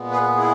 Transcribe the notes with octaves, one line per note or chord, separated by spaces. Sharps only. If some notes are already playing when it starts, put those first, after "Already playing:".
Already playing: A#2 G#3 B3
G#4 B4
E4 G#4